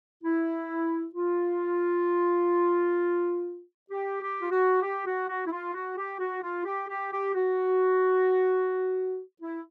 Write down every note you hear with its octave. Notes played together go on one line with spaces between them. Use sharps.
E4
F4
G4
G4
F4
F#4
G4
F#4
F#4
E4
F4
F#4
G4
F#4
F4
G4
G4
G4
F#4
E4